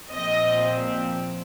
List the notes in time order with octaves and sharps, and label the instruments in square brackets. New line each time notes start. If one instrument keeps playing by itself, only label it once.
[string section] A#1 A#2 F3 C4 D#5